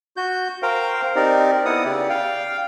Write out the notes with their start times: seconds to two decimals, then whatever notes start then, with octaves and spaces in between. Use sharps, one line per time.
0.17 F#4 G6
0.63 A#4 C5 F5 G5
1.16 C4 D#4 G4 A#4 D5
1.66 B3 E4 F#5 D#6
1.85 C#3 G4 D5
2.09 F5 G5